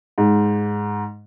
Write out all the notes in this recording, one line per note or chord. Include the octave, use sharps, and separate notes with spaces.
G#2